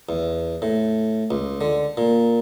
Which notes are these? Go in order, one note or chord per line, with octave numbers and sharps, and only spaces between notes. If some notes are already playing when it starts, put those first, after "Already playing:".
E2
A2
C#2
D3
A#2